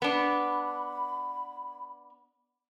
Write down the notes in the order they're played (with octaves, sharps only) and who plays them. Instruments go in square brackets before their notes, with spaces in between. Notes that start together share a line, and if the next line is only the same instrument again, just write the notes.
[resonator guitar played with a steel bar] B3 D4 [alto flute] B5